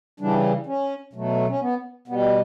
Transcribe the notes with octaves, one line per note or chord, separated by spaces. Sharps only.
C#3 E3 G3 D4
C#4
B2 F#3 A3
C#4
B3
B2 G3 B3